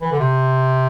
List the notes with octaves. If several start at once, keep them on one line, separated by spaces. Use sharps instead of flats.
E3
D3
C3